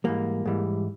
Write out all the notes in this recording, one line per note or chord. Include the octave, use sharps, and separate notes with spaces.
G#2 E3 G3 A#3
G#2 E3 G3